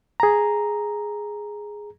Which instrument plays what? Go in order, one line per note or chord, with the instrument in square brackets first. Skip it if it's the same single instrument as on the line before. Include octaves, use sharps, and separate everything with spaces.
[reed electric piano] G#4 A#5